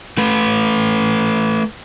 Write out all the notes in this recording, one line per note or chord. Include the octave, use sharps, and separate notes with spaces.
A3 B4